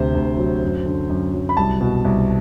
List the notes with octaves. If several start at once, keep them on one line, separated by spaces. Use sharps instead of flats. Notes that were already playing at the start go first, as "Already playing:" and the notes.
Already playing: D2 C3 C5
D2
F#3
F#2
D3
F#2
F#3
B5
C2 A5
B2
C2